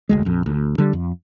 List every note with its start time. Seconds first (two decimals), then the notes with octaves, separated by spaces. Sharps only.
0.09 F1 D2 G#3
0.25 A#1 F2
0.46 D2
0.78 D3 G3
0.93 F2